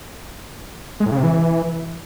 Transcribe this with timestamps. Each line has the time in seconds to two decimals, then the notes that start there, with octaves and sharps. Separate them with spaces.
1.00 G#3
1.06 A2
1.12 C#3
1.18 C3
1.23 E3